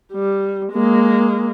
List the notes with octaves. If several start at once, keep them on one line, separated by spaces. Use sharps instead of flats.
G3
G#3 A#3